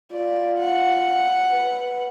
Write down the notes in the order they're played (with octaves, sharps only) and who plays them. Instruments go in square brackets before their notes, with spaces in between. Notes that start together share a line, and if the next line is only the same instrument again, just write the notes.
[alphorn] F4 [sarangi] D5
[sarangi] F#5
[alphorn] B4